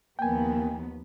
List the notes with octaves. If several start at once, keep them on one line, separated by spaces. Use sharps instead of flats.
D#2 F3 A#3 B3 G5 G#5